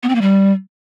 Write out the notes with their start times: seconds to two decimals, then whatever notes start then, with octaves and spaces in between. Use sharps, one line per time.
0.03 B3
0.09 C4
0.15 A#3
0.21 G3